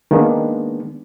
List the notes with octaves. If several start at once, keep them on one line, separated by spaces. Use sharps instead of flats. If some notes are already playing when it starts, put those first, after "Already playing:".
D#3 G#3 A#3 B3 D4